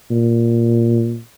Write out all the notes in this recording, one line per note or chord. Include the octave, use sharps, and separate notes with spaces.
A#2